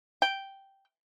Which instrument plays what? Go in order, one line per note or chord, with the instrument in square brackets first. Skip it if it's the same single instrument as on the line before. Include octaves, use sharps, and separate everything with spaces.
[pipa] G5